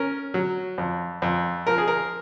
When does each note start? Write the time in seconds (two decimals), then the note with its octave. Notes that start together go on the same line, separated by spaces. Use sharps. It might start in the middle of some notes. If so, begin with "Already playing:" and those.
Already playing: C#4 A#4
0.34 F#3
0.78 F2
1.22 F2
1.67 F3 A#4
1.78 G#4
1.88 A#4